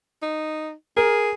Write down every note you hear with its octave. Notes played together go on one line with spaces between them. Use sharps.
D#4
G#4 A#4